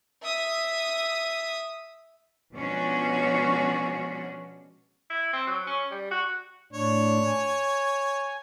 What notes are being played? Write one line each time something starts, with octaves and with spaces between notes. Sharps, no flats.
E5 D#6
B2 F3 G#3 C#4 D4 F#4
E4
C4
F#3
C#4
G3
F#4
A2 D4 C#5
G#5